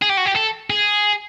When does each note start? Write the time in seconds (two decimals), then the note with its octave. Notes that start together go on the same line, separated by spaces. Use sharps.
0.02 G#4
0.10 G4
0.17 F#4
0.26 G4
0.36 A4
0.70 G#4